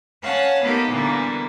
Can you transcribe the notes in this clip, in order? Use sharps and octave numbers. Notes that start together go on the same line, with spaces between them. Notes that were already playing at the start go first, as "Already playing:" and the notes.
C#4 C#5 F5 F#5 A5
A#3 B3 D#4 F4 G4 A4
A#2 D3 E3 G3 A#3 B3